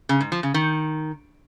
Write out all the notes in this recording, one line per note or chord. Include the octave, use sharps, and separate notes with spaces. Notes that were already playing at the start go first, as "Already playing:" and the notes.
C#3
G#2
F3
C#3
D#3